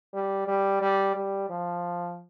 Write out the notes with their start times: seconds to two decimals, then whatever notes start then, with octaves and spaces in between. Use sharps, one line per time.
0.14 G3
0.47 G3
0.81 G3
1.15 G3
1.49 F3